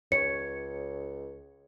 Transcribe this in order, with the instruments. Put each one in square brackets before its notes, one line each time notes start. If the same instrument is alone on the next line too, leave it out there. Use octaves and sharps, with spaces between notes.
[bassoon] C#2 [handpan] C#5 [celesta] C#7